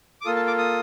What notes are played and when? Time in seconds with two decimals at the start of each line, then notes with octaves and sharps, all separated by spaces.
0.21 D6
0.25 A#3 F4 A4 D#6
0.36 A5
0.47 D6
0.58 D#6